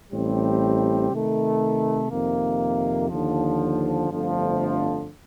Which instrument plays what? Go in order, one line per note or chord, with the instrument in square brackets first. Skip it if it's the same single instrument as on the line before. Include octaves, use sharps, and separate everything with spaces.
[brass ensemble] A1 A2 G3 C4 G4
C3 D#3 A3
F2 C3 D#3 A#3
D#2 D3 F3
G1 F2 D3 F3 A3